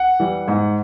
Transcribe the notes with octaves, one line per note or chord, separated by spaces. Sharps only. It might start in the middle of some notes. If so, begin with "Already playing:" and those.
Already playing: F#5
E3 G3
G#2